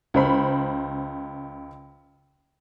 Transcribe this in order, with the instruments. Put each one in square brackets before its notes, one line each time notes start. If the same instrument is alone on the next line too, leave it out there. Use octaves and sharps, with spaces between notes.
[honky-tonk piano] C#2 C5 B5